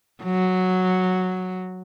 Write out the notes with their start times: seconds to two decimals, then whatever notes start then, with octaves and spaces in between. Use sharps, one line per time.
0.23 F#3